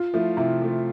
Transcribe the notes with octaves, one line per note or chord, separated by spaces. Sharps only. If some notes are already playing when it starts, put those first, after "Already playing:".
Already playing: F4
F3 A3 E4
C3 E4
F3 A3